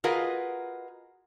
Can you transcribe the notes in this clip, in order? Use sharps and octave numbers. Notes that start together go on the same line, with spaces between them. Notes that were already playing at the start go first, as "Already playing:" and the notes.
F4 F#4 G#4 A#4 B4 D#5